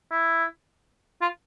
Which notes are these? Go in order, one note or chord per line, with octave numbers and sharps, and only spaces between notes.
E4
F4